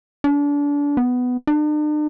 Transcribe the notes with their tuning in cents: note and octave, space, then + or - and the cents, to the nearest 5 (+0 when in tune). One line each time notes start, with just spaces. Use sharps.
D4 -30
B3 +10
D4 +45